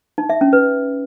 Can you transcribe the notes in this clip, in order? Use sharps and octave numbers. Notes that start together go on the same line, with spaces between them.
D#4
E5
C#4
B4